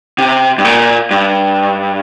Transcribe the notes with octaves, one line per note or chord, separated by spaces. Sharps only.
C3
G2
A#2
G2